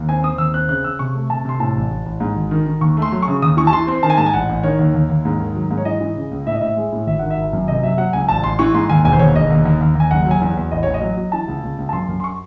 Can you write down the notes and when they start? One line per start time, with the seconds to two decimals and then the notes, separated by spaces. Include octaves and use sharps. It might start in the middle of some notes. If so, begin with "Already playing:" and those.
Already playing: D#2
0.08 C4 G#5
0.23 C4 D#6
0.38 D#2 E6
0.54 C4 F#6
0.68 C#3 F#6
0.84 C#3 E6
0.99 C3 C#6
1.15 A3
1.30 C3 A5
1.45 C3 C6
1.60 A2 A5
1.76 A1
1.90 A1
2.06 A1
2.20 G#2
2.36 G#1
2.51 D#3
2.66 D#3
2.81 D#2 C#6
2.97 A3
3.02 C6
3.12 F#3
3.22 C#6
3.28 C#3
3.42 D#2 D#6
3.57 E3 C#6
3.67 A5
3.73 E3 C6
3.87 C4 C6
4.03 D#3 A5
4.10 G#5
4.17 G#2 A5
4.26 G#5
4.34 A1 F#5
4.49 A1
4.63 D#3 C#5
4.79 D#2
4.94 D#2
5.10 D#2
5.25 G#2
5.39 D#3
5.55 F#3
5.71 G#2
5.77 C#5
5.85 E3 D#5
6.01 E3
6.16 C#3
6.31 C#2
6.47 A2 E5
6.55 D#5
6.61 A2 E5
6.77 G#3
6.92 A2
7.07 G#1 E5
7.19 D#3 F#5
7.30 E5
7.37 G#1
7.53 F#2
7.68 C3 D#5
7.83 F#3 E5
7.98 F#3 F#5
8.13 C#2 G#5
8.28 A1 A5
8.44 A1 C6
8.59 E3 C#6
8.74 G#2 C6
8.89 D#2 G#5
9.05 E1 G#5
9.13 C5
9.19 D#2 C#5
9.34 E1 D#5
9.50 D#2
9.65 D#2
9.81 D#2
9.95 D#2 G#5
10.11 F#1 F#5
10.26 F#3 G#5
10.42 E2
10.57 E2
10.71 A1 D#5
10.83 A1 C#5
10.94 D#5
11.02 F#3
11.17 F#3
11.32 E3 A5
11.48 C#2
11.63 C#2
11.78 C#2
11.89 A5
11.93 F#2 C6
12.09 F#2
12.20 C6
12.24 C#6